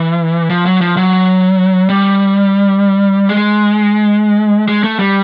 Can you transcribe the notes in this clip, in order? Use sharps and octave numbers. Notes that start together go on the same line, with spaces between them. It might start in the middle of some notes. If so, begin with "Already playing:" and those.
Already playing: E3
F3
F#3
F3
F#3
G3
G#3
G#3
A3
G3